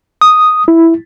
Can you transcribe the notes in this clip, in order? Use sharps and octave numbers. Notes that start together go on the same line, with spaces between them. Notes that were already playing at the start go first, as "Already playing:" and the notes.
D#6
E4